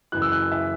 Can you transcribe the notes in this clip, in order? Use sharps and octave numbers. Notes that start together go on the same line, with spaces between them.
F#1 F#2 E3 F#6
E6
F#6
E5